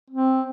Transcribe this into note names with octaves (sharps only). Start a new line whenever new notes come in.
C4